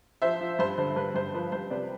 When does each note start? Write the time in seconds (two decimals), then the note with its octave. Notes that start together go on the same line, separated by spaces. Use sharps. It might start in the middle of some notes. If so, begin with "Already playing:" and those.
0.22 F3 C5 E5
0.41 F3
0.59 G2 C5
0.78 D3 C5
0.96 G2 B4
1.15 G2 C5
1.34 F3 B4
1.52 G2 C5
1.71 C3 B4 D5